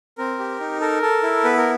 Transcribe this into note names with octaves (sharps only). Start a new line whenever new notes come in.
C4 A#4
G4
D#4
A4 A#4
A4
E4
B3 B4
A#4